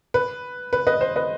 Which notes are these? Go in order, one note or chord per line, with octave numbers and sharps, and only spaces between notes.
B4
B4
B4 D#5
C5
B4 D#5